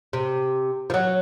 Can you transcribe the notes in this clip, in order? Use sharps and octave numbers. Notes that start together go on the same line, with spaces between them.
C3
F3
F#3